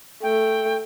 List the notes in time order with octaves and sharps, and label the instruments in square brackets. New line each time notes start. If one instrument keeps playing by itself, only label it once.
[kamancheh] A3 [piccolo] G5